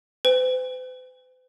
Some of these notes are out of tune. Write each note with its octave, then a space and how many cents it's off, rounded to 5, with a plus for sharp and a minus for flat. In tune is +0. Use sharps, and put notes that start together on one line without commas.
C5 -45 G5 +45